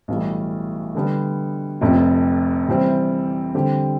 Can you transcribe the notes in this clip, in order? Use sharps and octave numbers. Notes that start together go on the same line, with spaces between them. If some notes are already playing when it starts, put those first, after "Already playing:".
B1 A2 E3 G3
D3 G3 B3
F1 F2 C3
C3 E3 G3 C4
D3 G3 C4 G4